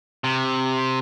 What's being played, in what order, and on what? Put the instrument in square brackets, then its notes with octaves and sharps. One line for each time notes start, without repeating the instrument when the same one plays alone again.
[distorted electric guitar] C3